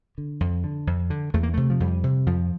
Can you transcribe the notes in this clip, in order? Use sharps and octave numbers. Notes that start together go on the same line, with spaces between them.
D3
F2
D3
F2
D3
E2 A3
A#3
C3 A3
F3
F2 G3
C3
F2 F3